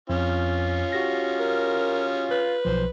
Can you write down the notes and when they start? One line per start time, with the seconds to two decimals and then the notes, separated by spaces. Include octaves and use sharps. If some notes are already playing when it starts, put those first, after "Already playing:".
0.10 F2 C#4 F4
0.92 F#4 G4 A#6
1.40 A#4
2.31 B4
2.65 B1 F3 C5